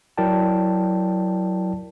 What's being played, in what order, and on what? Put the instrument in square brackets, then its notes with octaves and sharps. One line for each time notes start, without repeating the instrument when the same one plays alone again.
[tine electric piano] F#3 E4 A#4 D5 G5 A5